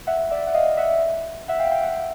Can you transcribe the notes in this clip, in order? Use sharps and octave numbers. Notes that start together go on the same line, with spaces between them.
E5 F#5
D5 E5
F#5
D#5 F5
E5 F#5
E5 F#5
F5 G5
F5 G5
E5 F#5